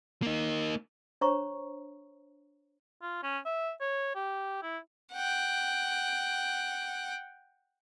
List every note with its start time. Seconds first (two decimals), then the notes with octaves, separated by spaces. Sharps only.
0.22 A#3 D#4
1.21 D4 C5 C#5 A#5 C#6
3.02 F4
3.23 C#4
3.45 E5
3.80 C#5
4.15 G4
4.62 E4
5.13 F#5 G5